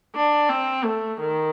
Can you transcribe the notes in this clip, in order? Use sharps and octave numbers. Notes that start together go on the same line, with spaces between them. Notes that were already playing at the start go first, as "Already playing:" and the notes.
D4
C4
A3
D#3